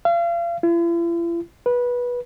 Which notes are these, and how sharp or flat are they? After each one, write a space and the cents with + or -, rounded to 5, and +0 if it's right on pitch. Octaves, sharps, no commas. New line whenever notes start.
F5 -35
E4 +45
B4 -20